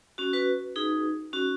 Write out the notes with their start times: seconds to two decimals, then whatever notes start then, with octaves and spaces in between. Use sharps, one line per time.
0.18 C#4 F#4
0.33 F#4 B4
0.76 D#4 G#4
1.33 C#4 F#4